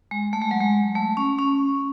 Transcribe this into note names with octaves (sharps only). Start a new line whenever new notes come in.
G#3
A3
G#3
F#3
G#3
A3
C#4
C#4